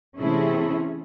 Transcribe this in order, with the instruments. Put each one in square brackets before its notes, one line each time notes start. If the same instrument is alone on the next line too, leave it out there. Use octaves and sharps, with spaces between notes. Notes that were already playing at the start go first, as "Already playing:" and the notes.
[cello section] C3 E3 A3 C#4 E4 G#4